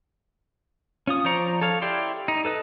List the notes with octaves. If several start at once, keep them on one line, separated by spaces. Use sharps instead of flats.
C#4 F4 D#6
F3 C5 D5 A#5 C#6
A4 C#5 F5
E4 G4 D5 C6
D#4
A4 B4 D#5